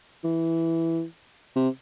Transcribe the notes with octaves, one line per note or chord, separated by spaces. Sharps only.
E3
C3